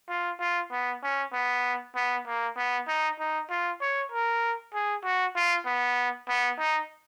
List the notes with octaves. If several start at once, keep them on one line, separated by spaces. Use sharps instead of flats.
F4
F4
B3
C#4
B3
B3
A#3
B3
D#4
D#4
F4
C#5
A#4
G#4
F#4
F4
B3
B3
D#4